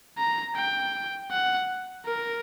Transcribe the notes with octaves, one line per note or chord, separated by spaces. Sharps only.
A#5
G5
F#5
A#4